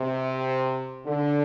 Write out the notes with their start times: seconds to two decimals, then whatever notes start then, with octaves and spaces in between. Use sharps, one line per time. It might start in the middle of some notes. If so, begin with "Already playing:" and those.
Already playing: C3
1.05 D3